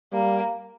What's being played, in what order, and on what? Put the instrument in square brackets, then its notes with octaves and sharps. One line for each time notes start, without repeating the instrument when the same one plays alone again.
[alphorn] G3 [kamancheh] A#3